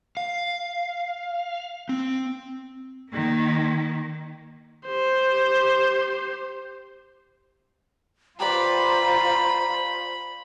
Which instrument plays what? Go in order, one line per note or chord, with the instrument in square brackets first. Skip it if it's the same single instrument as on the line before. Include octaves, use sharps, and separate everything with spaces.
[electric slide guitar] F5
C4
[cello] D#3 A#3
[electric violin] G4 C5
[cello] F4 C5 [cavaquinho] G4 B4 D5 [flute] A#5 [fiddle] B5